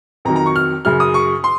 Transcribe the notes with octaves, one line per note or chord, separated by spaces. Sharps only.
F2 D#3 F#3 A#5
A#5
C#6
F6
F#2 C#3 F#3 F6
D#6
C#6
C6